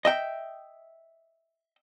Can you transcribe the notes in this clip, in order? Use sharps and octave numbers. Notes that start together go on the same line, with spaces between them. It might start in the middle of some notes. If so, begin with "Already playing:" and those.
D#5 E5 G5